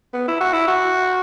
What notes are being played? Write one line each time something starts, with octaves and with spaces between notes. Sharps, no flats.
B3
E4
F#4
E4
F#4